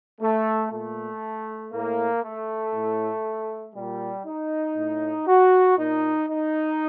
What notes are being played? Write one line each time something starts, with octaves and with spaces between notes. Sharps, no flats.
A3
A#2 A3
A2 A#3
A3
A2
A#2 G3
D#4
A2
F#4
A#2 D#4
D#4